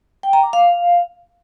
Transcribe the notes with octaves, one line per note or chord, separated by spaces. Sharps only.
G5
A#5
D6
F5